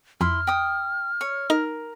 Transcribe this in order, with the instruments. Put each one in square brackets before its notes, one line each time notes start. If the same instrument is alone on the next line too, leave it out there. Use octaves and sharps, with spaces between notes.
[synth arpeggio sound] F2 [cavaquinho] E4 C6 [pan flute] F6
[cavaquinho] G5 D#6
C#5
[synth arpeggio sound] D#4 [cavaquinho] A#4